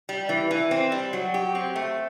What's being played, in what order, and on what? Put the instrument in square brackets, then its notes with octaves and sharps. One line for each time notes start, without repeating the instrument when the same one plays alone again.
[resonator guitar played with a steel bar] G3
E3
E3
C4
G3
F#3
G4
C4
A3